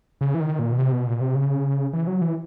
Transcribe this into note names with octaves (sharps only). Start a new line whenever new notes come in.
C#3
E3
D#3
A#2
B2
C3
B2
A#2
C3
C#3
E3
F#3
E3